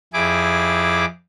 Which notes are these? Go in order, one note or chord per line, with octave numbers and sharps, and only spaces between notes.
F2 E4 G#4 D6